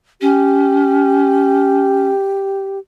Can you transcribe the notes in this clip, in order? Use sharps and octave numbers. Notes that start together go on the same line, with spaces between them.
C#4 G4